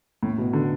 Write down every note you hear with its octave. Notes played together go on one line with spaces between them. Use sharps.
A2
B2
D3